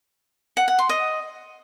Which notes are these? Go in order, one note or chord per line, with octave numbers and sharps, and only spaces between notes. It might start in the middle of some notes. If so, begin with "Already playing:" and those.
F#5
F#5
C6
D#5